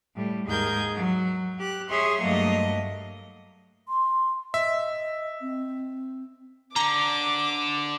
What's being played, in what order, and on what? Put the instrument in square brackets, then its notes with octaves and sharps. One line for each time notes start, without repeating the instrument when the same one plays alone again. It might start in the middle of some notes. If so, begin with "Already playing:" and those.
[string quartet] A2 G3
D#2 G#2 G#4 A#4 G6 G#6
F#3
G4 F#6
G#4 C#5 E5 C6 C#6
G2 F#3 A3 A#3 D#5
[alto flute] C6
[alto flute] D#5 [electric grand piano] E5
[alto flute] C4
[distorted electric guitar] D3 [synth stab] A#5 [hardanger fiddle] D6